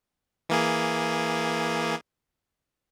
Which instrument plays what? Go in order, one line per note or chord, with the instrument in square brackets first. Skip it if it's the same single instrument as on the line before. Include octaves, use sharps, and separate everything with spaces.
[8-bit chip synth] E3 A#3 G#4